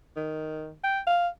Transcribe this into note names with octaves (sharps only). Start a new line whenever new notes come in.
D#3
G5
F5